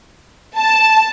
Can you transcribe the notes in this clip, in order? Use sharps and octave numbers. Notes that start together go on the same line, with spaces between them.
A5